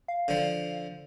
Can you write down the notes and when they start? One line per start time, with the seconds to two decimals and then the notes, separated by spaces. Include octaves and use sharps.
0.08 F5
0.28 D3 F3